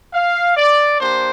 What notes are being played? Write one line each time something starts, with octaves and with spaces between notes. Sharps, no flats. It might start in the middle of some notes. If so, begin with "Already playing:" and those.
F5
D5
A#3 D4 G4 C5